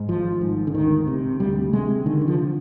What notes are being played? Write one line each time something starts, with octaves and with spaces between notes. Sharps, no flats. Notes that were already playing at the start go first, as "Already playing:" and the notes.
Already playing: G#2
G#1 F3
G#2
D3
D2 D#3
C3
D2 G3
C3 G#3
D3 D#3
D#3
F3